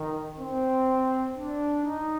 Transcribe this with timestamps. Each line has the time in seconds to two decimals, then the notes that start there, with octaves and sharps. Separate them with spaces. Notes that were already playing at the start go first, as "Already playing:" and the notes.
Already playing: D#3
0.38 C4
1.36 D4
1.85 D#4